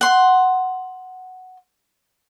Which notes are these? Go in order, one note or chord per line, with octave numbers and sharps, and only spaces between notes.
F#5 C6